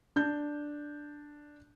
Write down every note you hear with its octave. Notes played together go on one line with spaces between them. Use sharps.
D4 G6